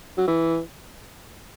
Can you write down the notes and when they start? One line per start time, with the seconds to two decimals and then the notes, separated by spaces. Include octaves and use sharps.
0.17 F#3
0.28 E3